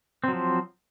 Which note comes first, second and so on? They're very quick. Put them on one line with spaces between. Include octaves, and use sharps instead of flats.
C4 F#3 F3